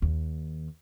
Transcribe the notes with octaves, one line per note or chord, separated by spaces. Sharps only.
D#2